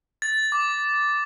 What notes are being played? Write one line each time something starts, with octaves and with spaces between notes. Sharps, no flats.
A6
D6